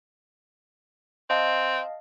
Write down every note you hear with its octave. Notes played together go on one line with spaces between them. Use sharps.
C4 D#5 F5 A5